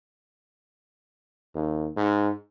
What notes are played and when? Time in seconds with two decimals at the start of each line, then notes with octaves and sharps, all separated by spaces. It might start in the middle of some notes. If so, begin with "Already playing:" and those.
1.55 D#2
1.96 G#2